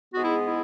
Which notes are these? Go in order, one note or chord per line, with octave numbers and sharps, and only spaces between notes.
G#2 G#3 B3 F#4
E4
E4